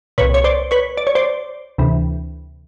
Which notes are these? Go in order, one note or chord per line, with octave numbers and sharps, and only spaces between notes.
C2 A#2 B4 C#5
C#5
C5 D5
B4 C#5
D5
C#5
C5 D5
D2 C3 E3